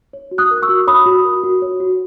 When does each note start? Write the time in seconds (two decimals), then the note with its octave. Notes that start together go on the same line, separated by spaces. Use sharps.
0.13 C#5
0.31 F#4
0.38 D#6 F#6
0.51 A#4
0.62 C#6 E6
0.69 F#4
0.87 C#5 B5 D#6
1.06 F#4
1.24 A#4
1.44 F#4
1.62 C#5
1.80 F#4